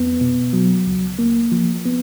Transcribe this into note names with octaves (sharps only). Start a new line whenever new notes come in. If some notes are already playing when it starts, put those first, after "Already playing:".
Already playing: F2 B3
B2
F#3
C#2
A#3
F3
B3